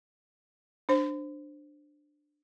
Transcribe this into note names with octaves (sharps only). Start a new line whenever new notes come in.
D4 C5